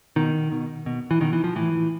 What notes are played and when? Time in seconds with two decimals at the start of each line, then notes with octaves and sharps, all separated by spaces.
0.16 B2 D#3
0.52 B2
0.86 B2
1.11 E3
1.21 B2 D#3
1.33 E3
1.44 F3
1.56 A2 E3